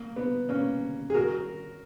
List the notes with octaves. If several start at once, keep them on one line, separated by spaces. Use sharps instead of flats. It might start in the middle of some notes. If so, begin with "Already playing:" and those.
Already playing: A#3
B3
A#3 C#4
G#4
F#4 A#4